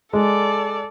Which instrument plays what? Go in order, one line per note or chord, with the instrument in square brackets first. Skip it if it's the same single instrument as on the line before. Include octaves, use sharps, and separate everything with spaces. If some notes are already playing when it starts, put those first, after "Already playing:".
[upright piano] G#3 [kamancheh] A4 D5